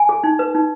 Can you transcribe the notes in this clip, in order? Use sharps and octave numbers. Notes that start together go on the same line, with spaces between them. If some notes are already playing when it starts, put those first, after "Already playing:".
Already playing: G#5
G#4
D#4
B4
D#4